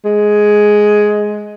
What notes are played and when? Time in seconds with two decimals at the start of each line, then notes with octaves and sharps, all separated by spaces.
0.05 G#3